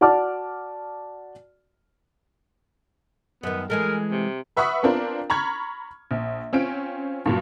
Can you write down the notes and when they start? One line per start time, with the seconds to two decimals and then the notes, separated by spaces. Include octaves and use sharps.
0.01 F#4 D5 F#5 A5 D6 F6
3.43 F#2 D#3 B3
3.70 E3 G#3 A3 A#4
4.12 C3
4.57 B4 E5 F#5 B5 C#6 D#6
4.83 B3 C4 D4 F4 A#4
5.30 A#5 B5 C#6 F6 G#6
6.11 A#1
6.53 C4 C#4 F4 D7
7.26 G2 A#2 F#3